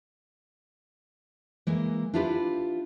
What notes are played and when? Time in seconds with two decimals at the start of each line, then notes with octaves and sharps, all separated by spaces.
1.67 E3 G#3 A#3
2.14 D4 E4 F4 G4 B4